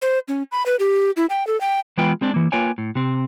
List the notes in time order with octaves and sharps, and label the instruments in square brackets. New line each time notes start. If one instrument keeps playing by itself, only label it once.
[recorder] C5
C#4
B5
B4
G4
E4
G5
A4
G5
[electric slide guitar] E3 G#3 B3 F4 B4 G5
G#3 C4 D4
E3 A#3
A#3 F4 B4 C#5 G5 G#5
A2
C3 C4